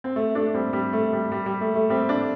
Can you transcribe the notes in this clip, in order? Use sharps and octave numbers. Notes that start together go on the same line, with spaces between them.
C4
A3
A3 D4
G3 C4
G3
A3
G3
G3
G3
A3
A3
G3 C4
A3 D4